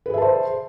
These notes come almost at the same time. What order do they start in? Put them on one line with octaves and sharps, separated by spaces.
B4 G#4 E5 A5 C5